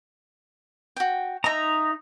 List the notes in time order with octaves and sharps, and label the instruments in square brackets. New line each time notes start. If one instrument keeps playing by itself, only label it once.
[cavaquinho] F#4 G5
[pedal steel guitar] D#4 A#5 [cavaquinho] D#5 E5